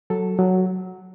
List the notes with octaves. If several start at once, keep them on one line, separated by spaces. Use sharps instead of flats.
F#3 A4
F#3